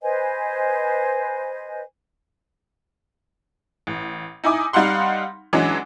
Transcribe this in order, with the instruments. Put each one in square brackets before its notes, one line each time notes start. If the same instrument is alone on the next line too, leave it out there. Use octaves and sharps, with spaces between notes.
[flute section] B4 C5 D#5 G#5
[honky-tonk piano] A1
D#4 E4 G#5 D6 D#6
G3 D#4 F5 F#5 C6
E3 F#3 G#3 C#4 D4